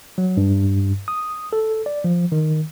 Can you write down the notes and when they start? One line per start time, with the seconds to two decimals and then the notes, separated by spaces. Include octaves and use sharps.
0.18 F#3
0.37 G2
1.08 D#6
1.53 A4
1.86 D5
2.04 F3
2.32 D#3